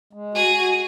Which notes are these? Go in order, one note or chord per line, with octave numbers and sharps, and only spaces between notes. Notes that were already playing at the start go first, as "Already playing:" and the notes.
G#3
F#4 G#4
F#4